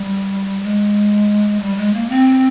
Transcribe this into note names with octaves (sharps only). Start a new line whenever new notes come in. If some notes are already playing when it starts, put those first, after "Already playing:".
Already playing: G3
G#3
G3
G#3
A#3
C4